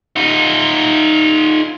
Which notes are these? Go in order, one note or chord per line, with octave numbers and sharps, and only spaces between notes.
D#4 F4